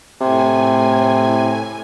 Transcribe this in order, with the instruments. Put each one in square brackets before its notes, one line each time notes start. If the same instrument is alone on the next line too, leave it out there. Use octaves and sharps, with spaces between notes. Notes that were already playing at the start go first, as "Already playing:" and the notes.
[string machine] A2 G#5 [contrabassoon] C3